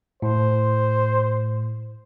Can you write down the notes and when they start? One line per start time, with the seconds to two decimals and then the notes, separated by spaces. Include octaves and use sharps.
0.22 A2 C5